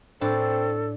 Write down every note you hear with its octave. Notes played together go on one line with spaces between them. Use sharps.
A2 C4 D4 A4 A6